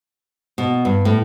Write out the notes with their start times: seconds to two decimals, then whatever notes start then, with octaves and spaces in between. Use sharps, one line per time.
0.58 B2
0.85 G2
1.05 A2